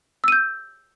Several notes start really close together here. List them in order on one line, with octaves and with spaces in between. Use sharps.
E6 D#7 G6